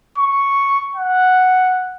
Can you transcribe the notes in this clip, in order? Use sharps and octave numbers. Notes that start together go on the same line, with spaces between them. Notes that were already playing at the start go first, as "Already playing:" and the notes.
C#6
F#5